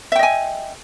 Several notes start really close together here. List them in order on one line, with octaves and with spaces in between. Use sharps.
E5 G5 D#5 G#5